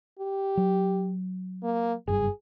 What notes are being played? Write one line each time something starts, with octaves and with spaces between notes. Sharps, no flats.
G4
F#3
A#3
F#1 G2 G#4